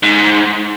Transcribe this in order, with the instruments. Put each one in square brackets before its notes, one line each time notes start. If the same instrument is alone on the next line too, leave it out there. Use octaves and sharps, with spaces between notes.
[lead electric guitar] G#2